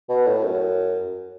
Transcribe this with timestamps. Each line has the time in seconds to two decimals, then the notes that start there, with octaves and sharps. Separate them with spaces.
0.09 B2
0.27 A2
0.44 F#2